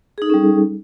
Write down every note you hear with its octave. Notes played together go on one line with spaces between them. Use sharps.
G3 C#4 D#4 G#4 A4